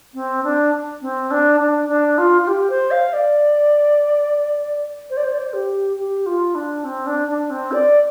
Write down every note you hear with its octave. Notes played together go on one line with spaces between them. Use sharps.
C4
D4
C4
D4
D4
D4
F4
F4
G4
C5
F5
D5
C5
D5
C5
D5
C5
G4
G4
F4
D4
C4
D4
D4
C4
D5